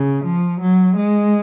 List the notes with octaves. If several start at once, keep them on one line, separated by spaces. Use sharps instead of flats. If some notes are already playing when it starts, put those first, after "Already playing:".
Already playing: C#3
F3
F#3
G#3